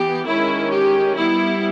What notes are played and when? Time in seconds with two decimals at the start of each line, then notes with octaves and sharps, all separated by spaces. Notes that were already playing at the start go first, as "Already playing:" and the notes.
Already playing: E3 B3 G4
0.26 D#3 G#3 C#4 E4
0.72 G4
1.16 G3 B3 E4